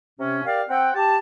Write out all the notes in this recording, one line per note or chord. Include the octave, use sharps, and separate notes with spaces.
C3 C#4
G4 A#4 D5 F5
C4 F#5 G5
G4 A5